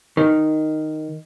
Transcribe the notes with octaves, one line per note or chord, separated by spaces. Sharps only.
D#3